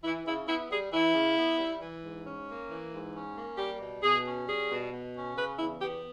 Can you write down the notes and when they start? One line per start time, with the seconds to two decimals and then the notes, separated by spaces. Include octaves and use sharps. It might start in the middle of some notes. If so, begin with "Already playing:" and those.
0.03 E3 E4
0.26 C#3 E4
0.47 B3 E4
0.69 G3 G#4
0.92 E3 E4
1.14 C#3
1.36 B3
1.59 G3
1.81 E3
2.03 G#2
2.25 C#4
2.47 A#3
2.70 E3
2.92 G#2
3.14 C#4
3.36 A#3
3.58 G3 G4
3.81 B2
4.03 B2 G#4
4.25 C#4
4.47 G3 G#4
4.70 B2
4.92 B2
5.14 C#4
5.35 C#3 B4
5.58 E2 E4
5.80 B3 G4